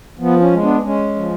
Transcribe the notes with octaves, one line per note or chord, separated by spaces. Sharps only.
F3 B3
C#4
G#3
B3 D4
G#3 C#4
F3